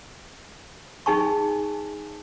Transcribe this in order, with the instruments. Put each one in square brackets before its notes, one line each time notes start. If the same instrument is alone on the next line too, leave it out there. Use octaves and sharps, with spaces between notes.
[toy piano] D#4 G#4 G#5 A5 C#6